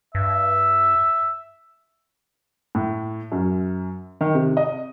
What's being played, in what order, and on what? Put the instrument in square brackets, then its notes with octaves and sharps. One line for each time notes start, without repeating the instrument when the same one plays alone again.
[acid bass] G2 [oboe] E5
[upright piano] A2
F#2
D#3
C3
D#5